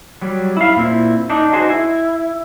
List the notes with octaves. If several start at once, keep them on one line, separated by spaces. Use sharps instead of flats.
F#3 G3
E4 F5
A#2 C4 E4
D4 D#4
D#4 F#4 G#4 C5
E4